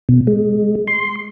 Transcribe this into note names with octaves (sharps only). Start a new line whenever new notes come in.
B2
G#3
C6